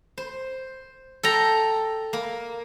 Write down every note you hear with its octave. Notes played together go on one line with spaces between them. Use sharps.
C5
A4 G5 A#5
A#3